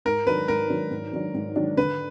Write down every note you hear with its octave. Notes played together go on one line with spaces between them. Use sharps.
G#2 A#4
D#3 F#3 D4 B4
G#2 A#4
D#3 F#3 D4
G#2
D#3 F#3 D4
G#2
D#3 F#3 D4
D3 B4